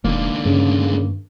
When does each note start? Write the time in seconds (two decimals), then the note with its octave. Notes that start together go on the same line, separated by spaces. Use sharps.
0.04 E1 C#2 D3 D#3 A#3
0.45 G2 C#3